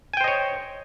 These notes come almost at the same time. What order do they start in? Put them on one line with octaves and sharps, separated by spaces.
G#5 G5 C5 D#5 C#5